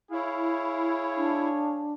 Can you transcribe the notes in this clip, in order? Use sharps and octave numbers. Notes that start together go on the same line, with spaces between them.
E4 G#4 C#5 F5
D4